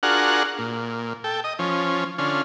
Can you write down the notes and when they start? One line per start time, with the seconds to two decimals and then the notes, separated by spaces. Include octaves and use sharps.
0.03 D4 F4 F#4 G#4 A#4 F#5
0.58 A#2
1.24 A4 G5
1.44 D#5
1.59 F3 C#4
2.18 D3 C#4 F4